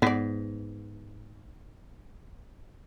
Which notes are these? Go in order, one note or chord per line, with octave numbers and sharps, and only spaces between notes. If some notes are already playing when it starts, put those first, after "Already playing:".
G#2 B3 D5